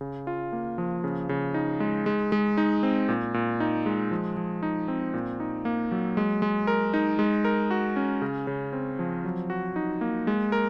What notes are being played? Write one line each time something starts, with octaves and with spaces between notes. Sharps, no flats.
C#3
F4
A#3
F3
C#3
C#3
D#4
G#3
G#3
G#3
D#4
C4
A#2
A#2
D#4
G#3
F3
F3
D#4
C4
A#2
D#4
A#3
F#3
G#3
G#3
A#4
D#4
G#3
A#4
F#4
C#4
C#3
C#3
C4
F3
F#3
F#4
D#4
A#3
G#3
A#4